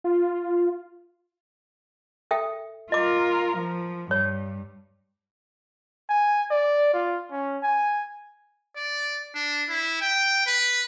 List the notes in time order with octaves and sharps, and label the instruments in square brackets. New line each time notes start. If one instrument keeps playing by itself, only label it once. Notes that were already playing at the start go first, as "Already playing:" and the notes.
[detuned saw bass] F4
[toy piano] A4 E5 G5
[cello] F4 A#4 [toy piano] D#5 D6
[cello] F3
[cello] G2 [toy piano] C#5
[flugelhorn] G#5
D5
F4
C#4
G#5
[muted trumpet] D5
D4
E4
G5
B4